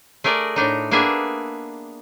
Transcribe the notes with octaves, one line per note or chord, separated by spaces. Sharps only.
A3 G#4 A#4 D5
A2 D4 D#4
A#3 B3 D4 G#4 E5